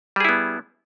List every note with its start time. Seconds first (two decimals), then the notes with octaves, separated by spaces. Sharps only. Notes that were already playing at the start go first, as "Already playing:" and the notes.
0.16 G3
0.20 G#4
0.25 E4
0.29 B3